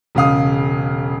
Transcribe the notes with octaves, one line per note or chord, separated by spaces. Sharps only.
E1 C#3 F5 D#6